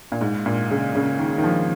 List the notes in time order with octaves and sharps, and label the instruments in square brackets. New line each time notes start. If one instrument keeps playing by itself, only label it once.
[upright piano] A#2
G#2
A#2
C#3
C#3
D#3
D#3
F3